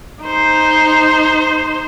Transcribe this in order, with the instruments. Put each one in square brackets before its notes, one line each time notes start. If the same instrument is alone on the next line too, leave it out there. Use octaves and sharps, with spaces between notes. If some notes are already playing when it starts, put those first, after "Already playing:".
[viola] D#4 C5